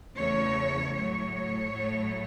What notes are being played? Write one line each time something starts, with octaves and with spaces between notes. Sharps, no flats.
E2 C#3 A3 C#5
A2 F#3 A3 C#5
A2 F#3 A3